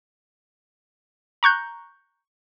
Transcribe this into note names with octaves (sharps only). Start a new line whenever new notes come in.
A#5 C#6 F#6 G6